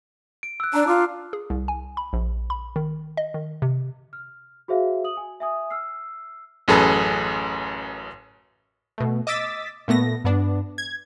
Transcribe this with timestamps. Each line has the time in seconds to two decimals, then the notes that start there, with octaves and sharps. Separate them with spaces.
0.43 D7
0.60 E6 F#6
0.73 D4 A5 A#5 E6
0.88 F4 D6
1.33 G#4
1.50 C2
1.68 G#5
1.97 B5
2.13 A#1
2.50 B5
2.76 D#3
3.17 D#5
3.34 D#3
3.62 C3
4.13 F6
4.68 F#4 G#4 C5 E5 F5
5.04 D#6 F#7
5.17 G#5
5.40 E5 G#5 D#6
5.70 E6 F6 C7
6.68 A1 F#2 G#4 A4 B4
8.98 B2 A3
9.27 D#5 D6 E6 A6 B6
9.88 A#2 A3 B3 A#6
10.24 G2 B3 D4
10.78 G#6